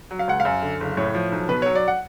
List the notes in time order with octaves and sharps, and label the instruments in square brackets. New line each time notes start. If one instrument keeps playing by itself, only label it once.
[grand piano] F#3
F5
C#2 F#5
F5
F#2
D3
F#1
A2 C#5
F3
B1
B2 B4
F#3 C#5
D5
F#5